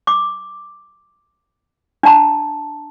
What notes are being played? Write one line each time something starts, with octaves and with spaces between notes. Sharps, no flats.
D6
D4 A5 A#5